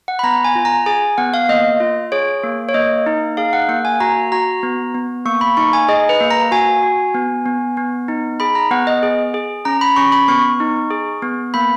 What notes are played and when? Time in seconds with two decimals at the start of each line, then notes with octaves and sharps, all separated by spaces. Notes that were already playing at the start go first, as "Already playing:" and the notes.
0.08 F#5
0.19 B5
0.23 B3 A#5
0.44 G#5
0.55 F4
0.65 A#5
0.86 G#4 G#5
1.18 B3 F#5
1.34 F5
1.49 A#3 D#5
1.80 F4
2.12 G#4 C#5
2.43 A#3
2.69 C#5
2.74 A#3 D#5
3.06 D#4
3.37 G#4 F5
3.53 F#5
3.69 A#3 F#5
3.85 G#5
4.00 F#4 A#5
4.32 F#4 A#5
4.63 B3
4.95 B3
5.26 A#3 C#6
5.41 B5
5.57 D#4 C#6
5.73 G#5
5.88 G#4 D#5
6.09 B4
6.20 A#3
6.31 A#5
6.51 F#4 G#5
6.83 F#4
7.14 B3
7.46 B3
7.77 B3
8.08 D#4
8.40 G#4 B5
8.55 A#5
8.71 B3 F#5
8.87 D#5
9.03 G#4
9.34 G#4
9.65 C#4 A#5
9.81 B5
9.96 C#4 C#6
10.12 B5
10.28 B3 C#6
10.60 D#4
10.91 G#4
11.22 B3
11.54 A#3 B5